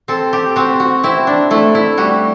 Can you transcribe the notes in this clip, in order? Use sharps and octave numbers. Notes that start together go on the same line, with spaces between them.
C4 A4
G4
C4 F#4
F#4
C4 E4
D4
A3 E4
E4
G3 F#4